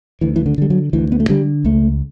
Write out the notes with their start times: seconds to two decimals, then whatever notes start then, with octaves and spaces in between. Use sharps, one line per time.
0.21 D2 E3
0.36 E3
0.46 D3
0.58 D3 G3
0.70 F#3
0.93 D2 E3
1.12 B3
1.20 A3
1.29 D3 G3
1.65 C#2 A3